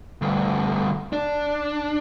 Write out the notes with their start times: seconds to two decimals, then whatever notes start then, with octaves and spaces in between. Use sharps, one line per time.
0.22 D2 G2
1.13 D4